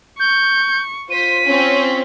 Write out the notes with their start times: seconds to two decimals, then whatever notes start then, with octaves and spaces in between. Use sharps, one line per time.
0.19 C#6 G6
1.10 F4 C5 B6 D#7
1.45 C4 C#4